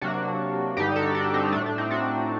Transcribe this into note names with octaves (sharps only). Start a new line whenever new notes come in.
C3 F#3 A#3 D4 F#4
G2 D3 G3 D#4 G4
F#4 A4
D4 F#4
C4 D#4
C4
A2 A3 D4
D4
C4 D#4
D4 F#4